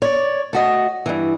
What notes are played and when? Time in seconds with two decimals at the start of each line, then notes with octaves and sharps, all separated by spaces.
0.02 C#5 D5
0.53 A3 F#4 D#5
1.06 G2 E3